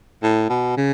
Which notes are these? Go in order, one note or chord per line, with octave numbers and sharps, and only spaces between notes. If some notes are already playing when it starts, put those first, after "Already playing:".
A2
B2
C#3